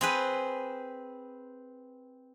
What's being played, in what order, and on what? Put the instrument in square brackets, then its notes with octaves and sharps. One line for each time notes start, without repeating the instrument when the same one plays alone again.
[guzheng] C4 G#4 B4